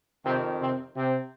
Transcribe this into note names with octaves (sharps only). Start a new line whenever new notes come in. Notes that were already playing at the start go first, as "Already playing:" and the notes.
F2 C3 D#3 C4
C3 C4
C3 C4